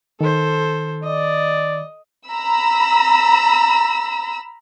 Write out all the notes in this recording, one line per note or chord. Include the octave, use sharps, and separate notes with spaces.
D#3 A4 C5
D5 D#5
A#5 B5 E6